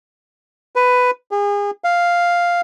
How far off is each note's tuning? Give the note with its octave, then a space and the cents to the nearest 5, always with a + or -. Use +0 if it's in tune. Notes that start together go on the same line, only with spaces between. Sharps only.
B4 +10
G#4 -35
F5 +0